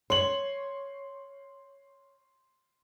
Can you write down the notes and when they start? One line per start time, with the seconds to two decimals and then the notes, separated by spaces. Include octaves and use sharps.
0.10 C#5 C6 F#7